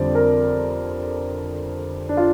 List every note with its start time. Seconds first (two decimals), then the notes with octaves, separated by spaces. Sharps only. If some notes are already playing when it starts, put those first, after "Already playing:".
Already playing: F2 D3 G3 C5 D5
0.15 A#4
2.09 D4
2.17 F4